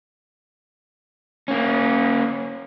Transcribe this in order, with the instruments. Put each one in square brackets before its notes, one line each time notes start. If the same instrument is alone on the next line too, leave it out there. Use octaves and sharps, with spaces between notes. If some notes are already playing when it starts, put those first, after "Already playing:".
[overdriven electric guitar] A#3 C#4